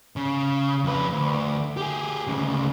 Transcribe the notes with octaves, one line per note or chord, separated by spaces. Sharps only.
C#3
F2 B4
D2
G4 G#4
D2 C#3